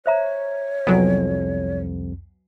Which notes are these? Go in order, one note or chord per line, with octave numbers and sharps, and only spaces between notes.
C5 C#5 E5 A#5
C2 F2 F#3 B3 G#5